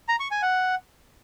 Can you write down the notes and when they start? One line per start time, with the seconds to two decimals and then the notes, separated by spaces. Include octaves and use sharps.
0.09 A#5
0.20 C#6
0.31 G#5
0.42 F#5